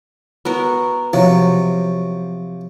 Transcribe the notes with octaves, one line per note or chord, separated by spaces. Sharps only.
B3 F#4 A#4
C3 F3 F#3